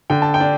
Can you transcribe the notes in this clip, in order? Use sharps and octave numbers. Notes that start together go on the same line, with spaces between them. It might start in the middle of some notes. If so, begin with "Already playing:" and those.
D3 G5
A5
G5
D4